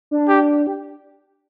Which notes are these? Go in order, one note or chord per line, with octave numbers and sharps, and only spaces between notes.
D4
G4
G4